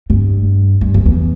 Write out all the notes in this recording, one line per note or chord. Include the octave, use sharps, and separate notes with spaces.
G2
G2
F2
E2